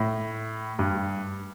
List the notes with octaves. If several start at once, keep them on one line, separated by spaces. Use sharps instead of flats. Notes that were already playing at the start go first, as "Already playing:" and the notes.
Already playing: A2
G2